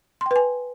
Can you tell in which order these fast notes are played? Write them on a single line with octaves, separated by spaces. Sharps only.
C6 G5 B4 G#5